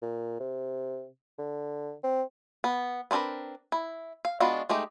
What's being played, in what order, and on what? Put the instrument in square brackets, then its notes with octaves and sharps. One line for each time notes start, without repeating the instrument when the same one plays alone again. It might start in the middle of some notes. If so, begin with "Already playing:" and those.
[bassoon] A#2
C3
D3
C4
[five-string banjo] B3
B3 C4 D4 A#4 B4
E4
F5
G#3 B3 D4 F4 F#4
G#3 A3 D#4 G4